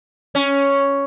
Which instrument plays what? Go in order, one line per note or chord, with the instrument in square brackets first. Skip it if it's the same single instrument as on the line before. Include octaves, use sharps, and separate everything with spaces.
[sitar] C#4